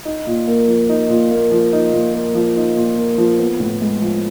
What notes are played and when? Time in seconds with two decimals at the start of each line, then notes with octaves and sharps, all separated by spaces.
0.05 D#4
0.27 A#2
0.48 A#3
0.68 F3
0.89 D#4
1.10 A#2
1.31 A#3
1.51 F3
1.73 D#4
1.93 A#2
2.14 A#3
2.35 F3
2.56 D#4
2.76 A#2
2.97 A#3
3.18 F3
3.39 B3
3.60 A2
3.81 G#3
4.02 F3